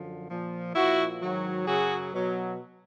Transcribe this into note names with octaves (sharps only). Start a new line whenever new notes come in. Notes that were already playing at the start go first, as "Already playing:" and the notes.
Already playing: F#2 D3 F3
A#2 F3
A#2 F3 E4 F#4
G#2 D#3 F#3
F#2 C#3 F#3 F#4 G#4
B2 F#3